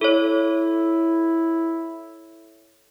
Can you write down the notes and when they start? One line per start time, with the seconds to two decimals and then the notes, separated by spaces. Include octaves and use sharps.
0.01 E4 A4 C#5